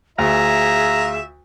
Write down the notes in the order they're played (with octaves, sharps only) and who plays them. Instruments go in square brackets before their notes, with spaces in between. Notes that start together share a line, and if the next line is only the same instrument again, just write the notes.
[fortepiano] D2 [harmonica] F4 E5 [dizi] G#4 [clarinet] A#5